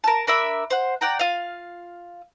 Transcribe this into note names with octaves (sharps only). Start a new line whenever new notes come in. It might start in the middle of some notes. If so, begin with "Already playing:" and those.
A#4 A5
D4 A#4 E5 B5
C5 F#5
D5 F#5 G5 A#5
F4 F5